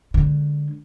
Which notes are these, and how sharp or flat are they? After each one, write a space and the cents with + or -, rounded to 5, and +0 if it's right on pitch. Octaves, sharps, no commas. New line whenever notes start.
D3 +0 G#3 +0